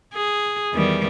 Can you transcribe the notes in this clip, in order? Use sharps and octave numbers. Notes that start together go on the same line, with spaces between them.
G#4
E2 D#3 G3